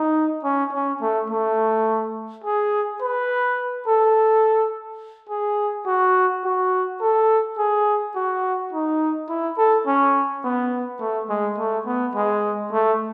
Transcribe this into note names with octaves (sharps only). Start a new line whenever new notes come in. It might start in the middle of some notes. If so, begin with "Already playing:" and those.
Already playing: D#4
C#4
C#4
A3
A3
G#4
B4
A4
G#4
F#4
F#4
A4
G#4
F#4
D#4
E4
A4
C#4
B3
A3
G#3
A3
B3
G#3
A3